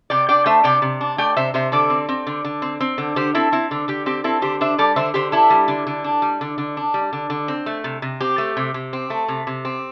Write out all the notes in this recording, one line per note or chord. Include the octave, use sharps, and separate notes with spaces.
C3 D5 G5
D4 D5 G5
A3 C5 E5
C3 D5 G5
C3
D4
A3 D5 G5
C3 C5 E5
C3 C5 E5
D3 A4 D5
C4
C4
D3
D3
C4
C4
D3
D3 G4 C5
C4 E4 A4
C4 E4
D3
D3 G4
C4 G4
C4 E4 A4
D3 G4 C5
D4 C5 E5
G3 A4 D5
D3 C5 E5
D3 G4 C5
D4 E4 A4
G3
D3
D3
D4
G3
D3
D3
D4
G3
D3
D3
C4
A3
C3
C3
C4 G4
A3
C3
C3
C4
A3
C3
C3
C4